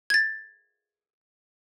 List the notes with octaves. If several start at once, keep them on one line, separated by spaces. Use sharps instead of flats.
G#6 A6